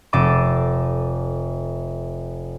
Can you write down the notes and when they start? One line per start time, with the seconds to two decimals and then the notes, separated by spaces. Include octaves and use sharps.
0.13 F1 A4 D6 D#7